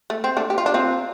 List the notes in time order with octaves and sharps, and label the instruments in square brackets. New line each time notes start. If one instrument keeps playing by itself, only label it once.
[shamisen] A3
C4
A3 D4
G4
F4
D4
C4 F4